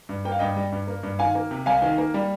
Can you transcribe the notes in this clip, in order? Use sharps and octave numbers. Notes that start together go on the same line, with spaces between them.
G2
A#3 G5
F5
G2 D#5 G5
G3
G2
A#3
G2
D#3 F5 G#5
A#3
C3
C2 F5 G#5
D#3
A#3
G3